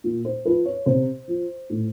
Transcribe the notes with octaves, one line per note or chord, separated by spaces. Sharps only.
A#2
C5
F3 B4
C#5
C3 C5
F3
A2